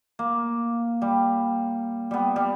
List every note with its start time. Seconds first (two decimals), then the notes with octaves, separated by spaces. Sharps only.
0.19 A#3
1.02 G3
2.11 G3 B3
2.36 G3